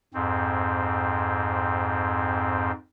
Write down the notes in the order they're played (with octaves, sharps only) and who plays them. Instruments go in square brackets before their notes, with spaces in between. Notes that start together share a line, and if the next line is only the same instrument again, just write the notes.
[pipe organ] F2 G#2 C4